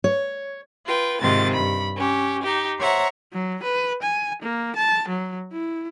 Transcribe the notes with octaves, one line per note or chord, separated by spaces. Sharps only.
C#5
F4 B4 G5
G#2 C3 D#3 C4 F4 A6
G2 B5
C#4 G4
D#4 G4
C5 C#5 E5 F#5 A#5
F#3
B4
G#5
A#3
A5
F#3
E4